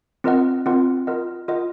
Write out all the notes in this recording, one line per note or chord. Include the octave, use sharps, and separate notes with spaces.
C4 F4 A#4 D#5 F#5
C4 F4 A#4 D#5 F#5
F4 A#4 D#5 F#5
F4 A#4 D#5 F#5